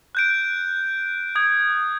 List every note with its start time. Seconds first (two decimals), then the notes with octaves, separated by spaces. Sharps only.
0.15 F#6 G6 D7
1.35 D#6 G#6